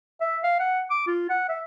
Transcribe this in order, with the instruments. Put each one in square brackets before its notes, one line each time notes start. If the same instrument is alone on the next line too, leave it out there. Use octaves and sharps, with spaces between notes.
[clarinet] E5
F5
F#5
D6
F4
F#5
E5